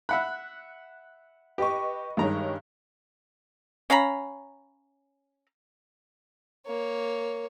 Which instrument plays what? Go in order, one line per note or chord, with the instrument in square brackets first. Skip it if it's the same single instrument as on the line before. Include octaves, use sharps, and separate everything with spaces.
[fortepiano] E5 F#5 B5 [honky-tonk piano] F#6
[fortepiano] G4 [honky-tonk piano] B4 D#5 C#6
[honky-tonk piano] G2 G#3 C#5 [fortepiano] D#3 A#5
[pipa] C#4 F5 A#5 B5
[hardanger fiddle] A#3 C#5